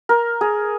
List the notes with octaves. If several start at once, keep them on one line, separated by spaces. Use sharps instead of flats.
A#4
G#4